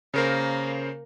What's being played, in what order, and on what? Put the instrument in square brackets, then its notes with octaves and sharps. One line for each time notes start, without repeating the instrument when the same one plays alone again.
[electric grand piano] C#3 A#4 C5 [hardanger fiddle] A#3